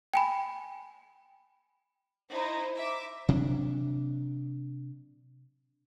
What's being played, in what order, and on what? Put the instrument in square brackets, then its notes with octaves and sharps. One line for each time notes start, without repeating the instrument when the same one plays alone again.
[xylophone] G5 G#5 B5
[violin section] D#4 E4 C5
E5 D6
[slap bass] C3 F#3 D4